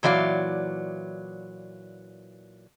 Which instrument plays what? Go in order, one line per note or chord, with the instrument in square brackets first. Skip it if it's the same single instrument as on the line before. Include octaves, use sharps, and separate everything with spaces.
[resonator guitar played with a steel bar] A#2 E3 F#3 D5 F5